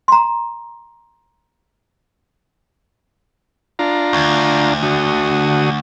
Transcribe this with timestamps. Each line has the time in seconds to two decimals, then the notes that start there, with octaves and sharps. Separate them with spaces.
0.08 A#5 C6
3.79 D4 F4 A#5
4.13 D2
4.83 D3 F#4 D#6